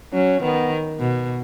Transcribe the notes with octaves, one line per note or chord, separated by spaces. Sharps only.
F#3 C#4
D#3 B3
B2